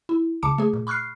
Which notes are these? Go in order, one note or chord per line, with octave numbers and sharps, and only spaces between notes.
E4
C#2 C#3 A5 D6 C#7
A3 G#4
A#2
B5 C#6 F6 F#6 C7